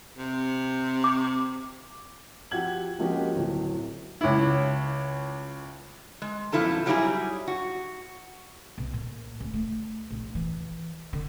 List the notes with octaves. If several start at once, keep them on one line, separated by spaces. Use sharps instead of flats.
C3
D6
F3 F#4 G4 F#5 G#6 F#7
F3 G#3 A#3 C#4 F#4 G4
D1 F#3
C#2 E4
G#3
F#2 B2 F3 E4 A4 A5
F#3 G3 A3 D4 E4 G#4
F#4
B1
A#2
D2
A3
A#1
E3
D3